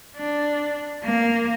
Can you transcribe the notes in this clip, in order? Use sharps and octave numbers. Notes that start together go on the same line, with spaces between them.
D4
A#3